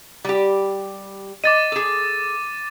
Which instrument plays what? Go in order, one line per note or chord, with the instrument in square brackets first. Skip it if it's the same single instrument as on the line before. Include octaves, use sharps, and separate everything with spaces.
[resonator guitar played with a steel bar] G3 G4
[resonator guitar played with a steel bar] D#5 [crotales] D6 A6 D#7
[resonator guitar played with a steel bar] G#4 A4